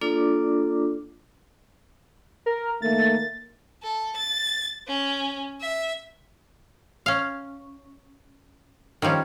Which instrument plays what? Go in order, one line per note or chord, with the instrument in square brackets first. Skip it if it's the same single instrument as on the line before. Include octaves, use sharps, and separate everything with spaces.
[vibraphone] A#3 D4 F4 A4 D5 D6
[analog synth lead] A#4
[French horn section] D#3 A3 A#3 [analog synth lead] A6
[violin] A4
A6
C#4
E5
[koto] C#4 F5
D#3 F3 G3 C#4